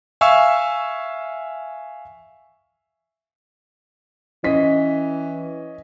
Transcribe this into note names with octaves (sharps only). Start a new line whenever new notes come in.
E5 F5 G#5 C#6 E6
E3 C#4 D#5 B6